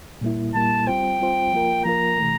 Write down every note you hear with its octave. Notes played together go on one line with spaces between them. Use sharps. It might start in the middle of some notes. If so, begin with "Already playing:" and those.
A#2 G3 A#3 E4
A#2 G3 A#3 E4 A5
G3 C4 F4 C5 G5
G3 C4 F4 C5
F3 A#3 F4 A#4
F3 A#3 F4 A#4 A#5
C3 E3 A3